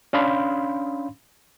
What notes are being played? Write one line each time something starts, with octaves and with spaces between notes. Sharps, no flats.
C#4 D4 F5 B5 C6